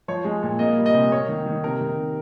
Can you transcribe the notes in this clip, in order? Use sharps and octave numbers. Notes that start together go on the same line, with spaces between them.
F3 C#5
G#3
A#2
A#3 D#5
G3
D#5
C3
A#3 C#5
D#3
D#3
C3 A#4
D#3
C3